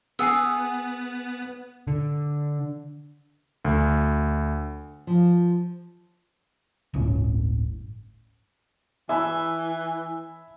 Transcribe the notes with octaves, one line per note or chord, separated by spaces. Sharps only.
B3 G#4 F#5 G#5 E6 C7
D3
D2
F3
D1 G1 A2 C#4
E3 E5 G#5 A5 B5